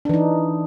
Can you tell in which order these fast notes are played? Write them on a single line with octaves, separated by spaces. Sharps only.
D4 E3 D#4